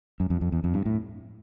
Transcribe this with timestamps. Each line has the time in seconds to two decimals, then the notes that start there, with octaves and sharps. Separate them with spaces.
0.20 F#2
0.30 F2
0.41 F2
0.52 E2
0.64 F2
0.74 G2
0.86 A2